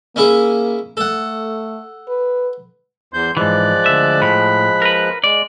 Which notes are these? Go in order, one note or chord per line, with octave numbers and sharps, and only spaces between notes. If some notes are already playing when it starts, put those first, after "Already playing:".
A#3 C#4 E4 G#4
A3 A4 F#5
B4
E2 C5 G6
G#2 E3 F3 G#3 D5 F#6
D2 G2 E5
A2 B5
A#4 B4
G#3 D5